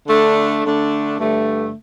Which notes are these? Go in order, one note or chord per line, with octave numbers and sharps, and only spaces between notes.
D3 A3 D4
D3 A3 D4
G2 D3 A3